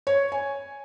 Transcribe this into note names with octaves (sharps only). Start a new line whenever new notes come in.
C#5
G#5